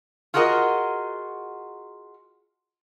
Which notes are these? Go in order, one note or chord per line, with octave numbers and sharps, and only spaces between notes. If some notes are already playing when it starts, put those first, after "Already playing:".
F4 F#4 G#4 A#4 D#5